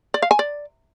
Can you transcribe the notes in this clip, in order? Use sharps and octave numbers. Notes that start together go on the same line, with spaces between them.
D5
F5
G#5
D5